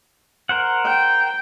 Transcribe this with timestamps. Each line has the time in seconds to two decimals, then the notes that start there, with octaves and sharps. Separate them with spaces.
0.49 A#4 C5 F#5
0.84 G5